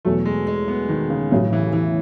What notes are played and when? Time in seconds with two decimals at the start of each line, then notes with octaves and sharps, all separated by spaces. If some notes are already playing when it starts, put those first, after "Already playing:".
0.05 E2 B2 F#3 A3
0.25 G#3
0.47 G#3
0.68 B3
0.89 D#3
1.10 C#3
1.31 A1 A2 C#3 F#3
1.53 E3
1.73 E3